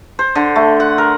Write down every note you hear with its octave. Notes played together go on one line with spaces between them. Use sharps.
C5
D3
A3
F#5
A#4